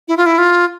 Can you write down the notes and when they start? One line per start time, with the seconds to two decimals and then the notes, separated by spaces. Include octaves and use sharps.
0.08 E4
0.17 F4
0.26 E4
0.38 F4